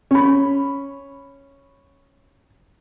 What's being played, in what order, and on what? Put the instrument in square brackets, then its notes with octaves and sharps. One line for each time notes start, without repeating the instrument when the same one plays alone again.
[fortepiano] C#4 B5